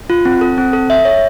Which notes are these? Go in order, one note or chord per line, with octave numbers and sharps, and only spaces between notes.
F4
C4
A4
C4
A4
E5
C#5